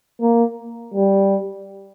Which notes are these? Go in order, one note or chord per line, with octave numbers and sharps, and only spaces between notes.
A#3
G3